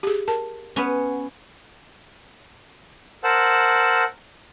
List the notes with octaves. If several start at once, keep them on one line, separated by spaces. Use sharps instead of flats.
G4 G#4
A#4 A5
B3 C#4
A#4 C5 F#5 A5 E6 F#6